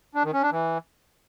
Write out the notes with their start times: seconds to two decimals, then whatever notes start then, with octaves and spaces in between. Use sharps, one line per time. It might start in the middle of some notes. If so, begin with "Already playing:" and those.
0.15 D4
0.24 D#3
0.33 C#4
0.42 D4
0.52 E3